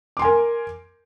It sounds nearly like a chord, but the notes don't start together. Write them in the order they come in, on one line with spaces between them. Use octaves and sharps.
D6 C6 G#5 A#4